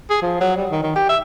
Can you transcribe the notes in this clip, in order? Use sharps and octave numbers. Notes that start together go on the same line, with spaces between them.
G#4
F3
F#3
G3
D#3
D#3
G4
E5